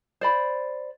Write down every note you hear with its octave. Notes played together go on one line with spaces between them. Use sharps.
C5 D5 B5